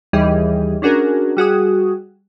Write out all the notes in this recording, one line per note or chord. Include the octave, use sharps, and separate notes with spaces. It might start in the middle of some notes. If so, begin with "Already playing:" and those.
D#2 E3 G3 G4 G#4 D#5
C#4 D4 F#4 G#4 A#4
G3 F#4 G#4 D#6